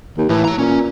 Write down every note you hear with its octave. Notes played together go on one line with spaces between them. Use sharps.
D#2
A2 E3
C#5 A#5
A#2 C#4